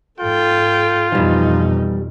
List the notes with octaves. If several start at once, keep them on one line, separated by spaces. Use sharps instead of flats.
G#2 F4 A4 G5
F2 B2 E3 F3 G3 D#4